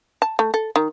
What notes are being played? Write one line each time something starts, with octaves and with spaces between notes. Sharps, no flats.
A5
A3
A4
D#3